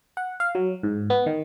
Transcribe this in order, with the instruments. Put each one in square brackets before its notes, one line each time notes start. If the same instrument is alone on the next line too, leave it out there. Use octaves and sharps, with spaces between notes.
[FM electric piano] F#5
F5
F#3
G#2
B3
D#3